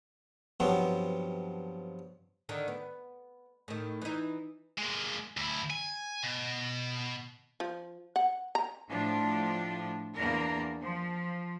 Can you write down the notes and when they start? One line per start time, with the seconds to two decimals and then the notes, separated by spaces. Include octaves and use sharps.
0.60 G2 F3 F#3 B3 C4
2.49 D3 D#3
2.68 B3
3.68 A2 D#3
4.02 E3 D#4
4.78 G#3 A#3
5.37 D2 E4
5.70 G#5
6.23 B2
7.60 F3
8.16 F#5
8.55 A#5
8.89 A2 F3 D4 F4
10.15 E2 A#3 D4 A#4
10.81 F3